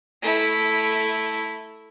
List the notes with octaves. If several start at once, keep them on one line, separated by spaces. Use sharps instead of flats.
A3 E4